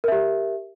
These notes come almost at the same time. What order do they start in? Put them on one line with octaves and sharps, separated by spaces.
A#4 E5 G4